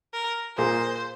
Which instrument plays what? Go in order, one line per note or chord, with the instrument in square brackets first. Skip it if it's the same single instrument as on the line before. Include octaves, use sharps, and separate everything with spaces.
[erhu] A#4
[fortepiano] A#2 A#3 G#4 [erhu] C5